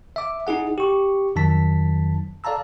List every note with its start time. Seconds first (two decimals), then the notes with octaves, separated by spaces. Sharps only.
0.16 E5 D6
0.47 D#4 E4 G#4 F#5
0.78 G4 C#6
1.36 F2 D#3 F#3 A5 B6
2.44 A4 D5 F5 A5 A#5 E6